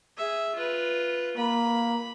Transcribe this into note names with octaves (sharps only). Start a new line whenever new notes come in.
G#4 E5
F4 B4
A#3 B5